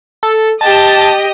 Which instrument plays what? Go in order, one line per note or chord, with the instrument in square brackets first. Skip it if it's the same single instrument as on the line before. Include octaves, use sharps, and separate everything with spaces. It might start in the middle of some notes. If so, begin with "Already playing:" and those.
[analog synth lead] A4
[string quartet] G4 D#5 [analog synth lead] A5